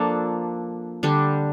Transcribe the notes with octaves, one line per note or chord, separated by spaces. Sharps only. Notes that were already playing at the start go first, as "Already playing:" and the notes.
Already playing: F3 A#3 D4 A4
D3 G3 D4